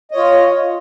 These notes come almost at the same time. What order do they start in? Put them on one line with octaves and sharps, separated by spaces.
D#5 C#5 F4